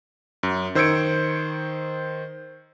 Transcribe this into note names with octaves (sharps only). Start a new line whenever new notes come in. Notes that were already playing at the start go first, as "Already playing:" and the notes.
F#2
D#3 C5 E6 G#6 C#7 D7